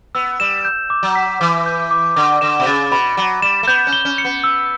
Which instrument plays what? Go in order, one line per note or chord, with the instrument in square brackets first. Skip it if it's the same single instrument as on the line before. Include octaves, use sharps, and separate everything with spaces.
[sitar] B3 [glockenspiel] E6
[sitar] G3 [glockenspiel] E7
[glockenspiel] G6
D6
[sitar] F#3
[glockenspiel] B6
[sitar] E3 [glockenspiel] D6
[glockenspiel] G6
D6
[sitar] D3 [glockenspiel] D6
[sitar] D3 [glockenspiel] E7
[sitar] B2
[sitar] C#3 [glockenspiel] A6
[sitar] B2 [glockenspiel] B5
[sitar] F#3 [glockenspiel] D6
[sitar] G3 [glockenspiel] E7
[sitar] A3
[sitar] B3 [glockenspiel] G6
[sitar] C#4
[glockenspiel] G7
[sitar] C#4
[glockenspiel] C#7
[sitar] B3
[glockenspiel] E6